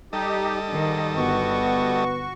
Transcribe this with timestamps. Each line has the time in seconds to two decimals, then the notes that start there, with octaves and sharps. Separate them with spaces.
0.13 G3 D#4 G4 A4 D#5
0.72 G#2 D#3
1.16 G1 B3 F#4 C#6